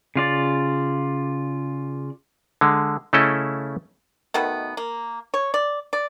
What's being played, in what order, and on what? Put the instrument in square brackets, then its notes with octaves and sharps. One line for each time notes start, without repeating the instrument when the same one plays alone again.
[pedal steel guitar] C#3 F4 D5
[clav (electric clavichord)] D3 G#3
C#3 A3 C#4 E4 A4 D#5
[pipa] B2 D#3 A3 B3
A#3
C#5
D5
D5